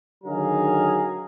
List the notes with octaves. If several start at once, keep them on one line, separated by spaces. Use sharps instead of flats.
D3 D#3 F#3 G#4 F5 A#5